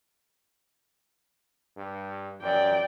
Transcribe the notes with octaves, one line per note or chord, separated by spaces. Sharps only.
G2
F#2 D5 G5